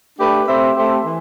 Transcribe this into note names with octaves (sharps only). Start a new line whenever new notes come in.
A3 D4 G4 B4
A3 C4 G4 C5 E5
A3 C4 G4 C5 E5
E3